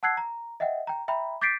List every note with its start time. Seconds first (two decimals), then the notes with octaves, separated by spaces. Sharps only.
0.03 F#5 A5 E6 F#6 G#6 C7
0.17 A#5
0.60 D#5 E5 F#5 G5
0.87 G5 A#5
1.08 E5 G5 A#5 B5
1.41 D6 G6 A6 B6 C7 D7